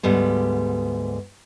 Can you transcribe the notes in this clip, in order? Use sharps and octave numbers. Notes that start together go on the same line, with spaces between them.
D2 G#2 G3 B3